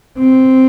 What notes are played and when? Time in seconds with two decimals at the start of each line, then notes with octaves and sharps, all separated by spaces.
0.19 C4